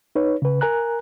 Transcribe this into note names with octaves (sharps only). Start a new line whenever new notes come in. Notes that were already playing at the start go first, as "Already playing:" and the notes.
D#4 B4 C#5
C#3 B4
A#4 G#5 A#5 F#6